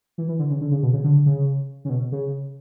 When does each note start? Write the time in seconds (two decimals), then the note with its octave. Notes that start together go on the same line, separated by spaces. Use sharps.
0.18 E3
0.28 E3
0.39 D3
0.50 C#3
0.61 D3
0.71 C#3
0.83 B2
0.93 C#3
1.04 D3
1.26 C#3
1.85 C#3
1.90 B2
2.12 C#3